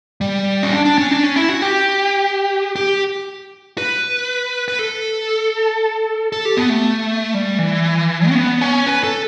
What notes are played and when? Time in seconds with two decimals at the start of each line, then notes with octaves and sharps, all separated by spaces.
0.21 G3
0.63 C#4
0.72 D4
0.85 D4
0.98 C#4
1.11 D4
1.23 C#4
1.36 E4
1.49 F#4
1.62 G4
2.76 G4
3.78 B4
4.68 B4
4.79 A4
6.32 A4
6.45 G4
6.57 B3
6.70 A3
7.34 G3
7.58 E3
8.29 C#4
8.35 B3
8.61 C#4
8.87 B4
9.03 A4